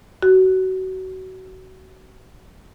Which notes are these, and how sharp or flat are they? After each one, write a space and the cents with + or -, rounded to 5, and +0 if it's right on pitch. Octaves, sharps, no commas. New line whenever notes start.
F#4 +25